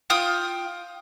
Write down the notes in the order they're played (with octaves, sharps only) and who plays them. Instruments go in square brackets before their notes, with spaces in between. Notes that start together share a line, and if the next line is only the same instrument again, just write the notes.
[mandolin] F4 G5 D#6